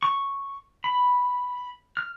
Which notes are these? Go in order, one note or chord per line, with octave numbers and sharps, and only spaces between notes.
C#6
B5
F6